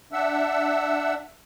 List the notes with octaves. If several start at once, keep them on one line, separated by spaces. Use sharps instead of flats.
D4 E5 F#5 E6